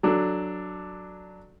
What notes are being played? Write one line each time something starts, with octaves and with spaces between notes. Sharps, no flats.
F#3 D4 A4